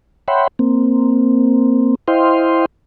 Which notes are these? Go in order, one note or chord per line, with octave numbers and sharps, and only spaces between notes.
C#5 E5 F#5 G5 B5 C6
A#3 C4
E4 C5 D#5 F5 G5 C6